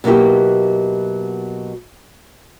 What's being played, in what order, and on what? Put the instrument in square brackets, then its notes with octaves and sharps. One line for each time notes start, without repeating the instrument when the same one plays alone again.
[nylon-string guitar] B2 F#3 A#3 E4 G4